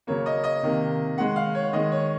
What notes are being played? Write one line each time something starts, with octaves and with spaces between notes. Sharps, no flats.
C#3 F#3 A#3 C#5
D#5
D#5
C3 D#3 A#3
D#3 G#3 F#5
F5
C#5
D#3 G#3 D#5
C#5